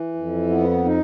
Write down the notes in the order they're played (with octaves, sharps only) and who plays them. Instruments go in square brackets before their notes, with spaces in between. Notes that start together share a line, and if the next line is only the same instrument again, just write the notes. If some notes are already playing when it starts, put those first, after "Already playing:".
Already playing: [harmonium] E3
F2
B3
D#4